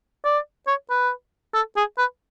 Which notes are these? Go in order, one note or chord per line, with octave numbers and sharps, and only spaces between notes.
D5
C#5
B4
A4
G#4
B4